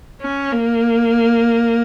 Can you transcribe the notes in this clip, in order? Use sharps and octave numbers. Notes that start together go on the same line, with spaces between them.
C#4
A#3